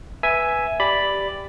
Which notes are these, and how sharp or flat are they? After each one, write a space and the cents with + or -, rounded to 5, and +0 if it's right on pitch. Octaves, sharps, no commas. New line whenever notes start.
B4 +0 E5 +0 G#5 +5
G4 +0 D5 +0 B5 +0